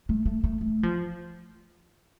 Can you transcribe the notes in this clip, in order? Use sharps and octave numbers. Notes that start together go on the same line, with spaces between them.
A3
A3
A3
A3
F3